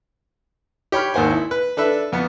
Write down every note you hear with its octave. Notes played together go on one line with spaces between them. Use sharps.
G4 C#5 B5 F6
G#1 D#2 A#3 C5 F#5 G#5
E4
B4
D4 A4 B4 E5
F2 B3